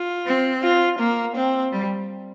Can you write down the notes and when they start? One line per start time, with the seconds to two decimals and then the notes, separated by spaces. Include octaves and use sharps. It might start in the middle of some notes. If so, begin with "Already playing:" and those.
Already playing: F4
0.26 C4
0.63 F4
0.99 A#3
1.36 C4
1.72 G3